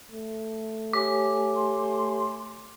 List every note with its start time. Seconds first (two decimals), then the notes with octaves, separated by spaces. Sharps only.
0.12 A3
0.93 G4 C#5 G#5 D6
1.55 C6